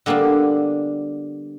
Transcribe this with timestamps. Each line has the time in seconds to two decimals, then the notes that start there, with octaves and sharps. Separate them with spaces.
0.06 D3 G3 A#3 B3 D4